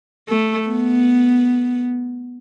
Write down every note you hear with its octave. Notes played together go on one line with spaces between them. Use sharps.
A3
B3